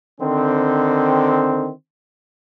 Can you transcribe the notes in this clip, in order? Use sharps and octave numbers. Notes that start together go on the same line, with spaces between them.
D3 D#3 C4